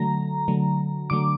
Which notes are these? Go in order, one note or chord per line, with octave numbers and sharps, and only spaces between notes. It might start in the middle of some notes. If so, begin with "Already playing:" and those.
Already playing: D3 F#3 A3 A#5
D3 F#3 A3
D3 F#3 A3 D6